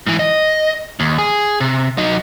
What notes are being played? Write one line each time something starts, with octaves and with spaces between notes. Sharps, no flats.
G#2 E3
D#5
D#2
G#4
C3
F#3 D#4